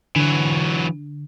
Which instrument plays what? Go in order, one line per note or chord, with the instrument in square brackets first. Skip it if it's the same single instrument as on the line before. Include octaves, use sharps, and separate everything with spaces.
[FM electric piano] D3 [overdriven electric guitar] E3 F#3